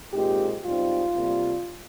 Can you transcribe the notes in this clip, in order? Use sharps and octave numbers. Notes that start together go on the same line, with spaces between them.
A#2 G#3 C4 D#4 G4
G#2 G3 C4 D#4 F4
C3 G3 A#3